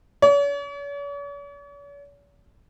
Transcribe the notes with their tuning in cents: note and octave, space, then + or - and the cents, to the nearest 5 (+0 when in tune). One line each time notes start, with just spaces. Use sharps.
C#5 +45